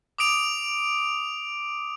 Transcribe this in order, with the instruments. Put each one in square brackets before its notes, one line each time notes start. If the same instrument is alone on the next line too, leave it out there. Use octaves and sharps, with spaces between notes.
[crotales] D6 D#6 D7 F7